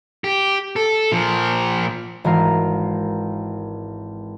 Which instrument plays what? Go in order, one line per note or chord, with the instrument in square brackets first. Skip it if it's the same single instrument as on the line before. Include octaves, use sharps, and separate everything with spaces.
[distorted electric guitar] G4
A4
A#2 F3
[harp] G#1 E3 A#4 F5